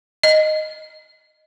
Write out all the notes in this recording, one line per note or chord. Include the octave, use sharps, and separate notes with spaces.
D#5